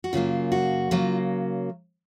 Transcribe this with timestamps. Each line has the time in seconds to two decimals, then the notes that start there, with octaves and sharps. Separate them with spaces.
0.04 F#4
0.13 F#2 C#3 F#3 A#3 F4
0.52 F#4
0.91 C#3 F#3 A#3 F4